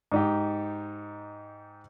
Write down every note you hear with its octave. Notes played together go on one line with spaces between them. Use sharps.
G#2 D#4 G4